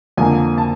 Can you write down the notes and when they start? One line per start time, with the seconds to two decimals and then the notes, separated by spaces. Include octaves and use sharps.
0.17 F2 D3 F3 A#3 G#5
0.58 A5